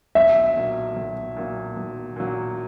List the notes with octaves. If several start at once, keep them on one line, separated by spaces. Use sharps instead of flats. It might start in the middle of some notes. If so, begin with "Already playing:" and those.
B1 E5
A#2 F#3
B1
A#2 F#3
B1
A#2 F#3